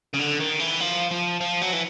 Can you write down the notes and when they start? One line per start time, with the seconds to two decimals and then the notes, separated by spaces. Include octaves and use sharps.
0.13 C#3
0.19 D3
0.40 D#3
0.60 E3
0.81 F3
1.11 F3
1.41 F3
1.62 F#3
1.73 E3